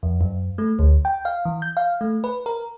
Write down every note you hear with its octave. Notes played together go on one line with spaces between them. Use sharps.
F2
F#2
A3
D2
G5
F5
E3
G6
F5
A3
B4
A#4